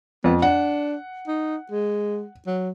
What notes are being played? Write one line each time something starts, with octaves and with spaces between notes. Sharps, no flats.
F2 B3
D4 F#5
D#4
G#3
F#3